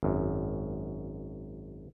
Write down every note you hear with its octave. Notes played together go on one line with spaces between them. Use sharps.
G#1 F#2